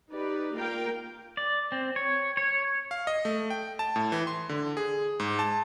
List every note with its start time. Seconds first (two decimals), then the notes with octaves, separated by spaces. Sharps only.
0.12 D#4 G4 B4 D5
0.55 A#3 F4 A#4 F5 G5
1.37 D5
1.72 C4
1.96 C#5
2.37 C#5
2.91 F5
3.07 D#5
3.25 A3
3.50 G5
3.79 A5
3.96 A2
4.12 E3
4.27 C6
4.49 D3
4.77 G#4
5.20 G#2
5.39 A5